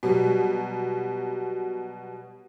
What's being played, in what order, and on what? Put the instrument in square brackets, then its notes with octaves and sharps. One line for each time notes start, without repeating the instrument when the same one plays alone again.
[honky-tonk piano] B2 F#3 G3